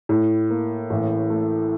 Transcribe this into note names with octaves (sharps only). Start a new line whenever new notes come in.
A2
A#3
A1
A3